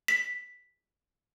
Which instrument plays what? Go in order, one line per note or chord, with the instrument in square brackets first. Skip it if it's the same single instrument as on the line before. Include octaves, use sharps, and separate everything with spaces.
[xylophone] B6